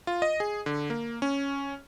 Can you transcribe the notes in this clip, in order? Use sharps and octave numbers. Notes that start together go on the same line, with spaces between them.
F4
D#5
G#4
D3
A#3
C#4